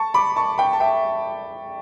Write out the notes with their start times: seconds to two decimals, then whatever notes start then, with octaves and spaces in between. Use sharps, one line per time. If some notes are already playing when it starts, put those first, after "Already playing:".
Already playing: A5 C#6
0.14 B5 D6
0.36 A5 C#6
0.58 G5 B5
0.73 A5
0.80 E5 G5